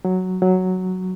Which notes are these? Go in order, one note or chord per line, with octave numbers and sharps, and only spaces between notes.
F#3
F#3